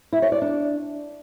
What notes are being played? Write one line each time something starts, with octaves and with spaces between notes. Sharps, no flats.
E4
C#5
D5
D4